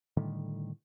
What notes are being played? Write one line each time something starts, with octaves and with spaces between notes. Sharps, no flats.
A2 D3 D#3 G3